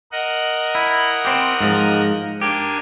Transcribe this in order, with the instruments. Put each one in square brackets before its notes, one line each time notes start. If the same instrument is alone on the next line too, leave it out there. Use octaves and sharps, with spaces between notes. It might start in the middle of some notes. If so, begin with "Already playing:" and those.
[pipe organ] A#4 D#5 F#5
[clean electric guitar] E4
C4 G4
G#2 F3
[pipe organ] A#3 D4 G#5 [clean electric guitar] G4